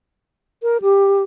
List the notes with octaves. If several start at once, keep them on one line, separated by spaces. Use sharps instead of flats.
A#4
G4